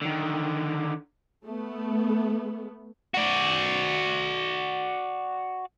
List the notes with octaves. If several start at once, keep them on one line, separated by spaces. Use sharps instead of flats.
D3 D#3
A3 B3
F#4 D5